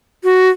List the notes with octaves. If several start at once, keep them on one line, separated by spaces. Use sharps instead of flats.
F#4